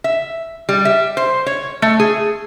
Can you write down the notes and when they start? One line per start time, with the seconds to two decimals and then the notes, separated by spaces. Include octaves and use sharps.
0.04 E5
0.69 G3
0.85 E5
1.17 C5
1.46 C#5
1.82 A3
2.00 G#4